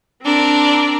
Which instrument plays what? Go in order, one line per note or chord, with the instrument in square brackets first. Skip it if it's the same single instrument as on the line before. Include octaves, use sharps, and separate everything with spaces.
[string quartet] C4 D4 A#4